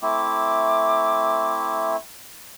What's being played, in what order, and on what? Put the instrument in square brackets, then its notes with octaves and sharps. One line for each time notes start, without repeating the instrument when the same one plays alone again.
[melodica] A3 C4 E4 [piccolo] D6